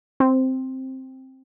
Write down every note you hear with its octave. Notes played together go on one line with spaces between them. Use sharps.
C4